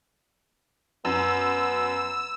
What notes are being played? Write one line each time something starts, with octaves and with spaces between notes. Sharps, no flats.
F#2 B3 E6